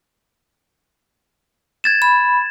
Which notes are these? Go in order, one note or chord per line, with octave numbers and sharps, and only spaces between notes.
G#6 A6 E7
B5